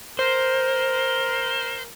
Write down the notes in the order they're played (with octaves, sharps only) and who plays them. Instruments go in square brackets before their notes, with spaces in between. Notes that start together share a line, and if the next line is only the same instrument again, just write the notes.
[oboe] A#4 [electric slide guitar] C5